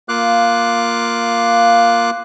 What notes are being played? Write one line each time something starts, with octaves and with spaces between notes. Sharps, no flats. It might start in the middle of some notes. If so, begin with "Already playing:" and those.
A#3 F4 F5 D6 F#6